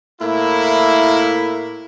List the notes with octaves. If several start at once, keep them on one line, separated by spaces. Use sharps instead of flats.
A2 A#3 E4